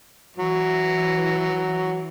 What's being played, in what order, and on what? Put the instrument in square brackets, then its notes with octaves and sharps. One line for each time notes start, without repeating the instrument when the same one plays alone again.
[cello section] E3 [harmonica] F#3